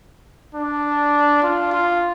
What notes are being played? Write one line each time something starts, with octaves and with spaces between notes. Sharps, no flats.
D4
F4
F4